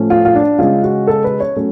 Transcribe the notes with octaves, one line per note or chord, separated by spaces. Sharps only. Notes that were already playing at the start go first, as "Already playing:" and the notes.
Already playing: A2 F3 A3 C#4
F4
F4
D4
C#3 G#3 C#4 F4
F#4
A4
B4
C#5
F#3 A3 C#4